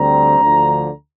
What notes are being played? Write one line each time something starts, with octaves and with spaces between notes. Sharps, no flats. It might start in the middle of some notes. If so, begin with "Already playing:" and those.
Already playing: D2 D3 G3 C4 A#5
D2 D3 F3